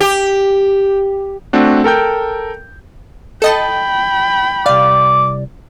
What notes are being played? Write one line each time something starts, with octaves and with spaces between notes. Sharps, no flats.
G4
A3 C4 D4 F#4
A4 A#4 G5 G6
A4 D#5 G5 A5 B5
C2 D5 F5 D6